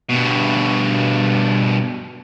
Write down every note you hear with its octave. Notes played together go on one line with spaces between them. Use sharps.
G2 B2